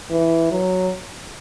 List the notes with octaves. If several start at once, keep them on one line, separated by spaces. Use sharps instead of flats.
E3
F#3